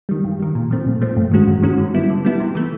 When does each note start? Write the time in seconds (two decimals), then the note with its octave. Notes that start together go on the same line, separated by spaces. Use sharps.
0.09 D#3 G3
0.24 G2
0.39 D#3 G3
0.55 A#2
0.71 F3 A3 C4
0.86 A#2
1.01 F3 A3 C4
1.17 G2
1.31 D#3 G#3 C#4 F#4
1.47 G2
1.63 D#3 G#3 C#4 F#4
1.78 D3
1.94 G3 B3 E4
2.10 D3
2.25 G3 B3 E4
2.40 C3
2.55 E3 A3